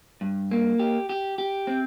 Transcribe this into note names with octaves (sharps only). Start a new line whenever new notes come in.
G2
A#3
G4
G4
G4
C4